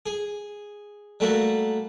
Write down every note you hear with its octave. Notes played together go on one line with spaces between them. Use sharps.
G#4
G3 A3 A#3 F#4